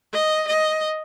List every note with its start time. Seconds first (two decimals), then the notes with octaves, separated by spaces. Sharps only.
0.14 D#5
0.48 D#5